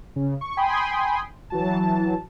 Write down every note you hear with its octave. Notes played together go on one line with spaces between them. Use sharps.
C#3
C#6
G5 G#5 B5 C6 D#6
E3 F#3 A5